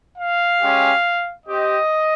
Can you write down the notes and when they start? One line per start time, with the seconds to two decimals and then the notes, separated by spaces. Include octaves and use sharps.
0.18 F5
0.61 G#3 C#4 G4
1.46 C4 G4 D#5